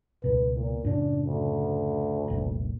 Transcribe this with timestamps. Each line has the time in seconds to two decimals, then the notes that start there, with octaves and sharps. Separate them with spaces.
0.24 C#2 B2 B4
0.56 A#2
0.85 F#2 A2 C#3 D4
1.26 D2
2.28 F1 C2 A#2